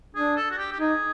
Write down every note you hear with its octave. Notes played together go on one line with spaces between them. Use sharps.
D4 G#4
A4
F#4
G4
G4
D#4 G#4